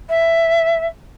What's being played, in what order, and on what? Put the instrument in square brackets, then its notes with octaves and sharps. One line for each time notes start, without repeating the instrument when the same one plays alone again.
[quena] E5